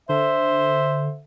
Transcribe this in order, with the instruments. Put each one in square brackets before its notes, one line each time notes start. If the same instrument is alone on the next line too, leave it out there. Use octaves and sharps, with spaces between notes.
[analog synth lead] D3 [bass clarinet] C5 [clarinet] E5